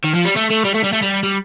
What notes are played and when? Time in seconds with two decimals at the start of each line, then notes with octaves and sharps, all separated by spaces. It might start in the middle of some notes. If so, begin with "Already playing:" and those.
0.04 D#3
0.14 F3
0.25 G3
0.36 A3
0.50 A3
0.65 G3
0.74 A3
0.84 G3
0.93 A3
1.02 G3
1.23 G3